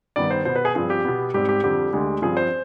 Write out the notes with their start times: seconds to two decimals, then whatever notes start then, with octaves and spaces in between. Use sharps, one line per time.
0.16 G2 D#3 G3 B3 D5
0.31 C5
0.45 B2 B3 C5
0.56 B4
0.65 G#4
0.75 G2 F3 C4 G#4
0.90 G4
1.04 B2 B3
1.34 G#2 G3 C4 G4
1.49 G4
1.64 F2 D3 G3 C4 G4
1.93 D2 D3 G#3
2.22 G2 F3 C4 G#4
2.37 C5